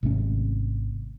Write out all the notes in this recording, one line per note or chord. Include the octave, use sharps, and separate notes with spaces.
G#1 C3 A3 C#4